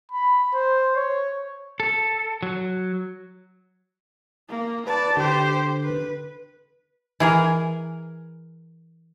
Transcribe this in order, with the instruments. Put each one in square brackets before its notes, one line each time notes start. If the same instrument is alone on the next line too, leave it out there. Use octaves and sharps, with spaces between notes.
[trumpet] B5
C5
C#5
[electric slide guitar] A4
F#3
[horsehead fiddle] A#3
[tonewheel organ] B4 [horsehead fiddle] D5 A5
[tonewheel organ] D3 [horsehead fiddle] G4 C5
[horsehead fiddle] B4
[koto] E3 G#4 A#4